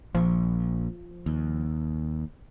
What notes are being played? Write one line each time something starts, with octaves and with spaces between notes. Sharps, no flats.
A#1 F3
D#2